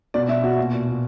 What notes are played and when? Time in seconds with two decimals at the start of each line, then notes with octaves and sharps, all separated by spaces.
0.14 B2 D5
0.28 B2 E5
0.43 B2 F#4
0.58 A#2
0.73 A#2
0.87 A#2